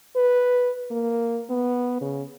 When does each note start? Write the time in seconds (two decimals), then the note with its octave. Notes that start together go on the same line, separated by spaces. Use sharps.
0.16 B4
0.91 A#3
1.50 B3
2.01 C#3